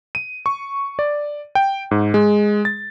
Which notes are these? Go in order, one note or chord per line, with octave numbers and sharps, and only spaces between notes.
D#7
C#6
D5
G5
G#2
G#3
A6